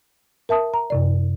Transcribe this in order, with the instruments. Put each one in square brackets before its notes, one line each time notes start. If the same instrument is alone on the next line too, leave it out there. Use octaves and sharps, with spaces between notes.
[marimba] A#4 E5 A5 D#6
A#5
F#2 C3 D5